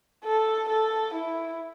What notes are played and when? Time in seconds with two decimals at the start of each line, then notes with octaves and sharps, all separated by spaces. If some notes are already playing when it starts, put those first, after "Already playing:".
0.24 A4
0.69 A4
1.14 E4